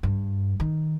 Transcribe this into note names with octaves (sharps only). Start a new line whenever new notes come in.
G2
D#3